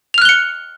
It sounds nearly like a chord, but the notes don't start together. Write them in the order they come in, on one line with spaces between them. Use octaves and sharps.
F7 F6 F#6 G7 C#7